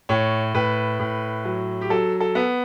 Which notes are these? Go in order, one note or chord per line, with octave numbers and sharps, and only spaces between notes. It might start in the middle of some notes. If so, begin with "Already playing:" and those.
A2 C#5
A2 B4
A2
F#3
G4
F#3 A4
A4
B3